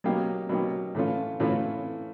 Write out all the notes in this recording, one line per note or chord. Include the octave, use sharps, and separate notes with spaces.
B2 F#3 A#3 D#4 G4
B2 F#3 A#3 D#4 G4
A2 E3 A3 C#4 F4
A2 E3 A3 C#4 F4